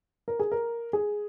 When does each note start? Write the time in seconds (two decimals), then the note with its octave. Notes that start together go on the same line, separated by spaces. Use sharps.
0.28 A#4
0.39 G#4
0.51 A#4
0.93 G#4